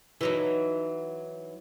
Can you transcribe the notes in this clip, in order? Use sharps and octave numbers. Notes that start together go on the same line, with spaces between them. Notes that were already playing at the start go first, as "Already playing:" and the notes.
E3 F#3 D#4